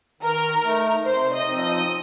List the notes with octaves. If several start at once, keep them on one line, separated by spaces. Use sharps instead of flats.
D#3 A#4
A3 D#4
C3 C5
D#5
F3 C4 D#4
D#5